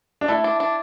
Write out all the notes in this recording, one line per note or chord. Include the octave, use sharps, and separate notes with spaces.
D4
A3 E4
D4
D4